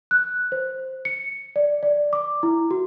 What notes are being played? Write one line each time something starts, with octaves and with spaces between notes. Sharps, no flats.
F#6
C5
C#7
D5
D5
D6
E4
F#4